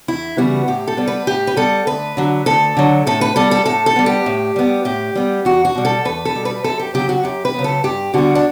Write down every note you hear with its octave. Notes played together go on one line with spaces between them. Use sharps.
E2 E4
C#3 E3 G3 B3 F#4
A2 G4
A4
G3 B3
B4
A2 G4
B4
G3 B3 A4
D2 B4
D3 F#3
D2 A4
D3 F#3
A2 A4
B4
G3 B3 A4
A4
A2 A4
A4
G3 B3
G4
A2
G3 B3
A2 G4
G3 B3
E2 F#4
F#4
B2 G3
A4
E2 B4
A4
B2 G3
B4
F#2 A4
G4
C#3 F#3 B3 G4
F#4
F#2 G4
B4
C#3 F#3 B3
A4
G2 G4
D3 G3 B3 F#4
D4